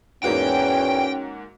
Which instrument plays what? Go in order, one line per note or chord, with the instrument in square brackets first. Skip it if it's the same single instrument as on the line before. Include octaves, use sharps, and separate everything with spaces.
[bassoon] E2 [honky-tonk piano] G#2 A#3 F#4 [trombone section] C#4 [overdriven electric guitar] G5